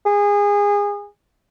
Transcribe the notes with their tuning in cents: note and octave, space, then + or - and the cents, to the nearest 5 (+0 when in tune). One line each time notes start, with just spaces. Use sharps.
G#4 -25